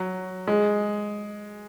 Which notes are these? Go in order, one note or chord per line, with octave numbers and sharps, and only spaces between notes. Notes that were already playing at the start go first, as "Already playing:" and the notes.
Already playing: F#3
G#3